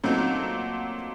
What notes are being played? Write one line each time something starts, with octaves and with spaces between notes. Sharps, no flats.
A#2 F#3 A3 C4 D#4